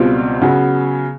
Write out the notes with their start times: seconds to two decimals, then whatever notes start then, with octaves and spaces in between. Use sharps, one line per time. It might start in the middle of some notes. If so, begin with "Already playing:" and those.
Already playing: C#2 B2 G3 C4 F4
0.41 C#3 F#3 B3